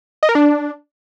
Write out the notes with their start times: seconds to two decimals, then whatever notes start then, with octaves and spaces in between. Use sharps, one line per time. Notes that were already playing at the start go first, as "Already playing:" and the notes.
0.23 D#5
0.29 A#4
0.35 D4